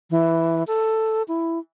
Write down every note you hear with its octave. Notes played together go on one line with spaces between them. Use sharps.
E3
A4
E4